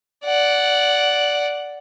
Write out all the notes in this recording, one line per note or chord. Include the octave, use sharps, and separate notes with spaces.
D5 F#5